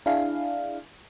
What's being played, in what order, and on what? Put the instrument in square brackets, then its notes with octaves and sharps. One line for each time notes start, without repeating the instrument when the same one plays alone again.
[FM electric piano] D4 E4 G#4 F5